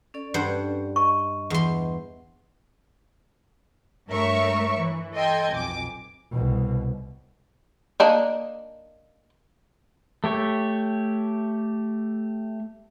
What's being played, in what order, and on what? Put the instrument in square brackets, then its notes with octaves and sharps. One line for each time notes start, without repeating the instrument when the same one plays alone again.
[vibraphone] C#4 A4 D5
[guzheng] G2 C5 F#5
[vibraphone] D#5 [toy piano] C#6
[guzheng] E2 C6
[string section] G2 A3 A#4 C#5 E5 C#6
E3
A4 D#5 G5 C6 G#6
B1 F2 G#5 D6
[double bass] C2 B2
[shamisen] A#3 D4 D#4
[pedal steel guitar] A3 G4 C#5